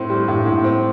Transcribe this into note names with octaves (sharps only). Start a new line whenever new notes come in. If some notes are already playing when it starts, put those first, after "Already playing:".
Already playing: A2 C4 C6
G3
A2
A2
C4